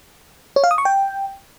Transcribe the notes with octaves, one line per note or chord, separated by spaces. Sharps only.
C#5
F5
D#6
C#6
G5